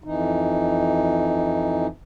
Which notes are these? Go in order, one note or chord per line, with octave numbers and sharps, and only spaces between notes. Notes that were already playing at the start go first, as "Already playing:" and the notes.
F2 E3 D#4